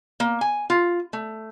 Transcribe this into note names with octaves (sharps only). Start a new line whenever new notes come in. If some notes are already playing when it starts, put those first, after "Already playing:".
A#3
G#5
F4
A3